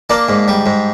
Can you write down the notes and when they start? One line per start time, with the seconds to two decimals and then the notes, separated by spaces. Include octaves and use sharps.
0.10 A#3 D4
0.29 G#2
0.48 G3
0.66 G#2